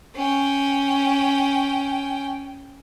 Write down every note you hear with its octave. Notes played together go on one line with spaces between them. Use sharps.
C#4 G5